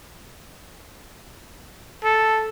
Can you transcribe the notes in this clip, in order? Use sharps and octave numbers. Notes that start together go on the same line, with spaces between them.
A4